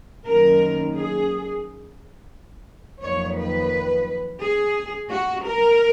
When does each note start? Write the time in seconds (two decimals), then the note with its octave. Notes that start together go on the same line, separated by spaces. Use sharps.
0.25 F#2 D#3 A#3 A#4
0.95 G#4
3.02 F2 D#3 F#3 A#3 C#5
3.38 B4
4.41 G#4
5.11 F#4
5.45 A#4